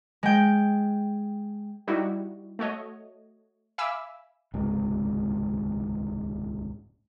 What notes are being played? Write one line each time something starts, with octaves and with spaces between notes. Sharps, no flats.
G#3 G5
G3 D#4 E4 F#4
A3 F#4 C#5 D#5
E5 F5 G#5 B5 D6 E6
D#1 C#2 G#2 C3